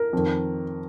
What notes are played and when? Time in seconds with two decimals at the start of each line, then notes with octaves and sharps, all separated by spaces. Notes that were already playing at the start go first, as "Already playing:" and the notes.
Already playing: A#4
0.13 F2 D#3